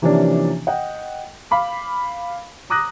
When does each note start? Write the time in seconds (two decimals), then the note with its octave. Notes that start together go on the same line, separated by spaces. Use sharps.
0.02 C3 E3 F3 A#3 C#4 D4
0.67 D#5 F#5 G5
1.51 F5 B5 D6
2.70 A#5 D6 D#6 F#6 A#6